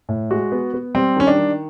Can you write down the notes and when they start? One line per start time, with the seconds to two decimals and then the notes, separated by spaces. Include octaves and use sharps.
0.09 A2
0.30 G#3 F#4
0.52 B3
0.74 B3
0.95 G3 C4
1.16 D#3 C#4
1.27 D4
1.38 D#3